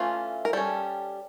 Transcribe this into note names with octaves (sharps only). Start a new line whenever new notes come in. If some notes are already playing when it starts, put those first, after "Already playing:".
Already playing: E3 A3 C#4 F4
A#4
G3 C#4 A4